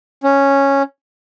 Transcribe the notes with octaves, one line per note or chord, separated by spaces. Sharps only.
C#4